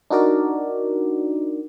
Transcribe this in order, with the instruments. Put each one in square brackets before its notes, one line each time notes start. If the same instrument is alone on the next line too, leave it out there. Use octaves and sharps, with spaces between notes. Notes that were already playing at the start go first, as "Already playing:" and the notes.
[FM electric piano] D4 D#4 F#4 A#4 D5